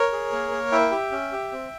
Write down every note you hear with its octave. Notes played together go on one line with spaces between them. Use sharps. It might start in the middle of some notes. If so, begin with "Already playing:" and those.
Already playing: A#4 C#5
G#4
A#3
A#3
E4 E5 G5
G4
C#4
G4
C4